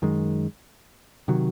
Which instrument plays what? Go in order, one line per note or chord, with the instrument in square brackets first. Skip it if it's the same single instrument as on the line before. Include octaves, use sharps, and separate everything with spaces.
[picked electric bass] F#2 D#3 G#3
C3 D#3 F#3